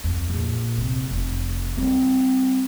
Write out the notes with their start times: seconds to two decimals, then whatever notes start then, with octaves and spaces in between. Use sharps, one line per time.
0.04 F2
0.30 A#1
0.78 C3
1.11 F1
1.77 G3 C4